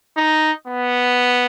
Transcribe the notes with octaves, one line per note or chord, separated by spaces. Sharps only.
D#4
B3